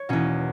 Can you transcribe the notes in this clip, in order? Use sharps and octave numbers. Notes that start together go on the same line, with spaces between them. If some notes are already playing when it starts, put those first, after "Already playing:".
Already playing: C#5
E2 B2 A#3 C#4